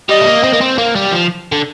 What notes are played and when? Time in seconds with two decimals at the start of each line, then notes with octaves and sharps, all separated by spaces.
0.09 G3 D#5
0.21 A3
0.26 A#3
0.43 C4
0.53 A#3
0.61 C4
0.78 A#3
0.95 G3
1.12 F3
1.52 D3